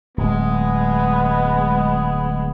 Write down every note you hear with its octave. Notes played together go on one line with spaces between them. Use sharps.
D1 G#3 B3